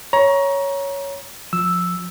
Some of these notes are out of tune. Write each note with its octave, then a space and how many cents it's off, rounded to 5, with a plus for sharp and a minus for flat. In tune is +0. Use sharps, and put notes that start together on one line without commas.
C#5 +5 A#5 +25
F3 +20 E6 +0